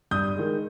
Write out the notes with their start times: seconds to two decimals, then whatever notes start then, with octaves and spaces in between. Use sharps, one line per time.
0.11 G2 D#6 G6
0.35 D#3 G#3